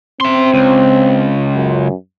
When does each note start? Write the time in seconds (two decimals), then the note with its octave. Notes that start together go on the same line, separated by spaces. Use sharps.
0.21 C4 E5 C6
0.54 C#2
1.55 F#2